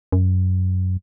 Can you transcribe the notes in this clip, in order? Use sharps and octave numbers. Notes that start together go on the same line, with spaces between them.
F#2